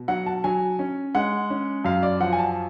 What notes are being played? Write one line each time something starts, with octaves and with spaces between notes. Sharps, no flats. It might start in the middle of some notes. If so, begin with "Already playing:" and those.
Already playing: B2
F#3 F#5
A5
F#3 G#5
C#4
G#3 F#5
C#4
F#2 F5
D5
F3 F#5
G#5
A5